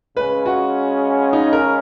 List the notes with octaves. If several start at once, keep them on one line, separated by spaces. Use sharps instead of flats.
C#3 G#3 C#4 B4
F#4
D#4
A#4